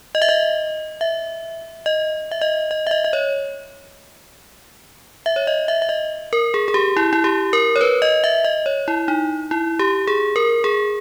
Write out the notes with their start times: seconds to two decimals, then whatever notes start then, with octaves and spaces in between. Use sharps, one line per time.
0.15 D#5
0.22 E5
0.29 D#5
1.01 E5
1.86 D#5
2.31 E5
2.41 D#5
2.71 D#5
2.87 E5
2.91 D#5
3.04 D#5
3.13 C#5
5.26 E5
5.36 C#5
5.47 D#5
5.68 E5
5.82 E5
5.89 D#5
6.33 A#4
6.54 G#4
6.68 G#4
6.74 G4
6.97 E4
7.13 E4
7.24 G4
7.53 A#4
7.76 C#5
7.81 B4
8.02 D#5
8.24 E5
8.45 D#5
8.66 C#5
8.88 E4
9.08 D#4
9.51 E4
9.79 G4
10.07 G#4
10.36 A#4
10.64 G#4